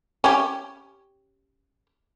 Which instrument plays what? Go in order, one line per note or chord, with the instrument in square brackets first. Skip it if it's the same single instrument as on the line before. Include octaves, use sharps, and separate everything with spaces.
[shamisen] C#4 G4